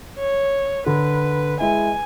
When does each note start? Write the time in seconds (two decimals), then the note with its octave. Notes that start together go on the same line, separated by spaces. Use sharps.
0.19 C#5
0.86 D3 B4
1.60 G#3 E4 G#5